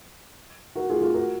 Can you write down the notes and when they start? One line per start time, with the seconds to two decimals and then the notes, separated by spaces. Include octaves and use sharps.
0.75 F#4 A#4
0.90 F4 G#4
1.01 F4 G#4
1.14 F#4 A#4